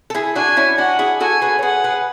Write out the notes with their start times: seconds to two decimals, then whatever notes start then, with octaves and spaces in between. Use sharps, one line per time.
0.10 A4
0.14 E4 G#4
0.35 D4 F#4 G#5
0.57 C#4 E4
0.78 D4 F#4 F#5
0.99 E4 G#4
1.20 F#4 A4 G#5
1.42 G#4 B4
1.59 C#5
1.63 G#4 B4 F#5
1.84 G#4 B4